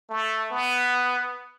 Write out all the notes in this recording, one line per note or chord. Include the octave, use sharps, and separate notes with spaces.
A3
B3